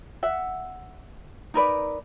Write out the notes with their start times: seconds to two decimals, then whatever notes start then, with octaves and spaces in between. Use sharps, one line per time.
0.23 E5 F#5
1.54 D#4 A#4 B4 D5